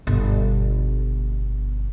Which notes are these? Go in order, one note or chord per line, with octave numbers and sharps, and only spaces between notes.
G1 B2